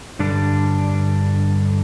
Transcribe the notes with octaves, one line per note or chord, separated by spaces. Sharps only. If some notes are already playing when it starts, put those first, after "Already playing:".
G2 D3 G3 D4